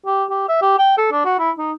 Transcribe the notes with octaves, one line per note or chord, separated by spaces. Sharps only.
G4
G4
E5
G4
G5
A4
D4
F#4
E4
D#4